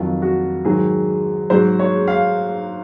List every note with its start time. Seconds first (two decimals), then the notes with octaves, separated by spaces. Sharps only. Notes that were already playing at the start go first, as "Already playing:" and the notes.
Already playing: F2 D#3 F#3 F4
0.22 F#4
0.65 G#2 D#3 F#3 G#4
1.50 G#2 F#3 C5
1.79 C#5
2.08 F5